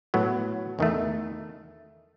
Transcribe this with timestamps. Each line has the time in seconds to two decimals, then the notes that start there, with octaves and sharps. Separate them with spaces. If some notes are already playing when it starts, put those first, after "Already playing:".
0.14 A2 F#3 B3
0.79 E2 D#3 A3